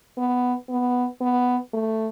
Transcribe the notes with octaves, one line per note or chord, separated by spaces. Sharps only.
B3
B3
B3
A3